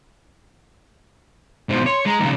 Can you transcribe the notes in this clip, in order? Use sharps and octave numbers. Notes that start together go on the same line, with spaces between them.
G#2 B2 C5
C#5 C6
G#3 A#5
D#2 C#3